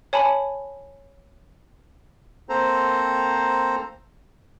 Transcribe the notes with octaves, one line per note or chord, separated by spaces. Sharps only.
C#5 G#5 A5 B5
A#3 C4 A4 C5 A#5